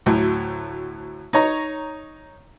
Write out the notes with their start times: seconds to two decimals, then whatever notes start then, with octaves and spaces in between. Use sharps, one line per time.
0.06 D2 A2 F#3
1.33 D#4 C#5 A#5